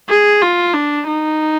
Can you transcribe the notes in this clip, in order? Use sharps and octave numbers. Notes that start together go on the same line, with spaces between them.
G#4
F4
D4
D#4